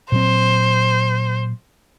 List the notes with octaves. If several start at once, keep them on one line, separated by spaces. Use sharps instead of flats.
A#2 F#3 C4 C5